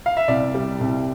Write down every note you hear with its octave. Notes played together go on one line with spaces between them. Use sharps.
F5
E5
C2 D5
G3
C2